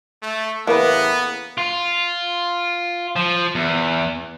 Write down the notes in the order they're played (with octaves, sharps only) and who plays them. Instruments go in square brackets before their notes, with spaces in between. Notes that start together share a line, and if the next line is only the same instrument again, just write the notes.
[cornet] A3
[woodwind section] A2 C#3 E3 [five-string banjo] A#3 B4 [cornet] B3
[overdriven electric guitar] F4
F3
E2